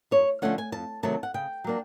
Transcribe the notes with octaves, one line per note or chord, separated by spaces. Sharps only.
F#2 C#5
D3 F3 A3 C#4 F#5
G#5
F2 A5
C3 D#3 F#3 A3 A5
F#5
C#3 G5
F#3 A#3 D4